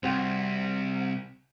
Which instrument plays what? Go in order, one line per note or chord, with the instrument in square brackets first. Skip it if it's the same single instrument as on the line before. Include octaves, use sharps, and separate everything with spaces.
[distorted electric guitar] C2 [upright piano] C4 F#4 G5